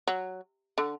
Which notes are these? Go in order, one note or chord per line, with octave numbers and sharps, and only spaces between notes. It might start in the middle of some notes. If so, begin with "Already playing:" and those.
F#3
D3